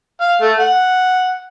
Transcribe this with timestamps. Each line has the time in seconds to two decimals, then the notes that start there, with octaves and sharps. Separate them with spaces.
0.20 F5
0.41 A3
0.59 F#5